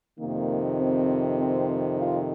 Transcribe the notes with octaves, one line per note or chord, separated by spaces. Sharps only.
F2 C3 D#3 A#3
C4
C4
F4